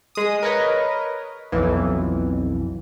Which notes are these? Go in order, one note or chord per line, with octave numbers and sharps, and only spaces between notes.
G#3 D#6
A#4 B4 C#5 D#5
B1 F2 E3